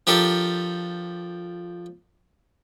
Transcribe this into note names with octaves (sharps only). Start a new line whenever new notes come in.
F3 D4 G4 A4 A#4